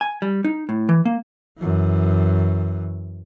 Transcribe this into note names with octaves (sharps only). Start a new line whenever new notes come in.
G#5
G3
D#4
A2
E3
A#3
F#2 E3